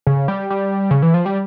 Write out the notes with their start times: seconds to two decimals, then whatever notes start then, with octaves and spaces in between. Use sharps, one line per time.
0.07 C#3
0.28 G3
0.50 G3
0.91 C#3
1.02 E3
1.14 F3
1.26 G3